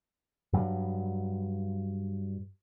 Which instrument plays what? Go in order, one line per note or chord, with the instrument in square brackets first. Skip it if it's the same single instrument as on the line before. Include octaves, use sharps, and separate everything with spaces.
[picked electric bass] G2 F#3